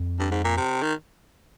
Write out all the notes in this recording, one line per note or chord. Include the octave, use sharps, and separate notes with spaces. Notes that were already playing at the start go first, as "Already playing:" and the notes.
Already playing: F2
G2
G#2
A#2
C3
D#3